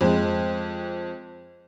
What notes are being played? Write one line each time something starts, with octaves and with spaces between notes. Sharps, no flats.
F2 G#3